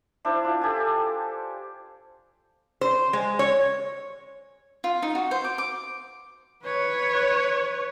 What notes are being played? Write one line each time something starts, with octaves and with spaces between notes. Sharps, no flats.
D4 E4 C5
F4
G4 A4 G#5
C5
G#3
C#5
F4
D#4
F#4
C5
D6
D6
B4 C#5